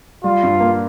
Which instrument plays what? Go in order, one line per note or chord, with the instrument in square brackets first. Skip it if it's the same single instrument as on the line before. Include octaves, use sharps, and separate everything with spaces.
[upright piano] G3 [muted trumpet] F4
[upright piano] G2
A#3